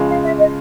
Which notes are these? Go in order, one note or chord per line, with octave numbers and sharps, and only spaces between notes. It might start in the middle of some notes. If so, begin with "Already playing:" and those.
Already playing: C#3 F3 G#3
F5
E5
D#5